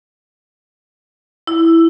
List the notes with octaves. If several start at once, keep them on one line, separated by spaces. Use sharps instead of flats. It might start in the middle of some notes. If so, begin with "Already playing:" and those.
E4